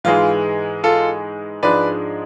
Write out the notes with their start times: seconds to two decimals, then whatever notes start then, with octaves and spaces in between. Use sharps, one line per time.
0.04 G#2 E3 G#3 F4
0.84 F4 A4
1.63 G#2 F3 G#3 D4 B4 D5